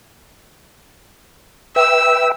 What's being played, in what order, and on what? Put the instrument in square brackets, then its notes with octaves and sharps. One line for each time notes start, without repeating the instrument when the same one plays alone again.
[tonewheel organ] B4 E5 G5 [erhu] E6